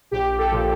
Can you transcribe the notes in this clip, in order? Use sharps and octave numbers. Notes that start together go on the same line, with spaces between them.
A#1 G4
A4
A#2 F3 A4